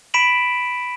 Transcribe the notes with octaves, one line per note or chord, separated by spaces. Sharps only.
B5 B6 D7 E7 F#7